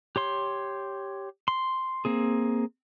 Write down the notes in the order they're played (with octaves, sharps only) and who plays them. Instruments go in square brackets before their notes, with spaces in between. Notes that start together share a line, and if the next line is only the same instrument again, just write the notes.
[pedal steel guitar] G4 C#5 C6
C6
A#3 C4 G#4